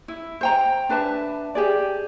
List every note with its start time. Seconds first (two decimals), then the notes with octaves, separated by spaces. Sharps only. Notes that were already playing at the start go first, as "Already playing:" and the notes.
0.08 E4
0.41 C5 G5 A#5
0.89 D4 B4 E5 A5
1.55 G4 G#4 D5